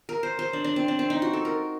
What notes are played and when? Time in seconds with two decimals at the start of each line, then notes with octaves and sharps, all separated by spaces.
0.09 A#4
0.23 C5
0.39 C5
0.53 D4
0.64 D4
0.76 C4
0.88 D4
0.99 C4
1.10 D#4
1.22 F#4
1.33 A4
1.45 A#4